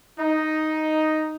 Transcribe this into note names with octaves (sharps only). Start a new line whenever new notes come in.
D#4